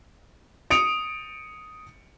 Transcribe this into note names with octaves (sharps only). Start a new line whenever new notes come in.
D#6 C#7 D7 F7